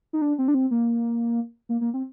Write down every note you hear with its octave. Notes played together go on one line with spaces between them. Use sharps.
D#4
D4
C4
D4
C4
A#3
A#3
A#3
C4